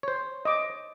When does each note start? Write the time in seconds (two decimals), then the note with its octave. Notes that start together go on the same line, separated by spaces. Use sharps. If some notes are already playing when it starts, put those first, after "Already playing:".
0.03 C5 C#5
0.45 D#5 D6